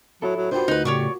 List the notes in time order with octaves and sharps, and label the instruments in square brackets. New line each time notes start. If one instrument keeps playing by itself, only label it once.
[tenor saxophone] F#3 [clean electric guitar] E4 A4
[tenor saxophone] F#3
[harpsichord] A#2 F#3 [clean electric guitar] D4 G4 B4 [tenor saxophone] C5
[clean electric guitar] D2 [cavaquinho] D#4 B4
[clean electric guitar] A2 C#3 [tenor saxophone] G4 [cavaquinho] C#5 D5 C#6